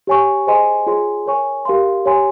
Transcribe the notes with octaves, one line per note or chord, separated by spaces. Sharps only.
G4 C#5 G#5 C#6
G#4 C5 D#5 G#5 C6
F4 G#4 C#5 G#5 C6
A#4 C#5 G#5 C#6
G4 A#4 F5 C6
G4 C#5 G#5 C6